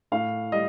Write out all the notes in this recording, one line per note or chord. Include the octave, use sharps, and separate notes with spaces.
A2 F5
G3 D#5